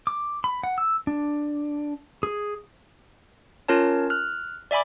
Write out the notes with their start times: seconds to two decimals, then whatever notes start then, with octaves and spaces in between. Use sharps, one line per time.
0.07 D6
0.44 B5
0.63 F#5
0.78 E6
1.07 D4
2.23 G#4
3.68 C#4 F4 A#4 C#5 A5
4.10 F6 F#6
4.71 D5 E5 G#5 B5 D6